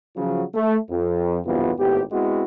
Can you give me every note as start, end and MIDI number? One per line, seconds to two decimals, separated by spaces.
0.16 0.43 49
0.16 0.43 53
0.16 0.43 54
0.54 0.77 57
0.90 1.39 41
1.45 1.72 35
1.45 1.72 40
1.45 1.72 43
1.45 1.72 48
1.45 1.72 59
1.45 1.72 65
1.78 2.02 32
1.78 2.02 45
1.78 2.02 59
1.78 2.02 67
2.11 2.45 56
2.11 2.45 59
2.11 2.45 60
2.11 2.45 64
2.11 2.45 66